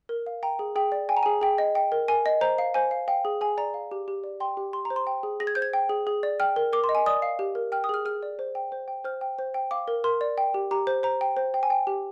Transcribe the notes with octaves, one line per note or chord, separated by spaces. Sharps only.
A#4
F5
G5 A#5
G#4
G#4 G5
D5
G5 G#5
A#5
G#4 G#5
G#4 G5
D#5
G5
A#4
A#4 G#5
D#5
C5 A#5
F5
C5 G#5
F5
F5 G5
G#4
G#4 G#5
D5 A#5
F5
G4
G4
D5
G5 C6
G4
G4 C6
A#5
C5
C6
G5
G#4
G#4 A#6
G#6
C5 G6
G#6
G5
G#4
G#4
D5
G5 F6
A#4
A#4 D6
C6
D#5
G#5
D5 D#6
F5
G4
A#4
G5 F6
D#6
G#4 F6
G#4 F6
D5
C5
G5
C5
G5
C5 F6
G5
C5
G5
F5 D6
A#4
A#4 C6
D5
G5
G4
G4 A#5
C5
C5 A#5
G5
C5
G5
G#5
G5
G4